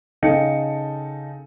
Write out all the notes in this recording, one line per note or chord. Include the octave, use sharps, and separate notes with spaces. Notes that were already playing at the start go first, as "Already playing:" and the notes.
C#3 D#4 A4 G5 C#7